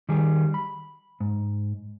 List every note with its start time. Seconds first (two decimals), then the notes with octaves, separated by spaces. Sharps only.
0.09 D#3 G3 G4 G#4
0.54 B5
1.20 G#2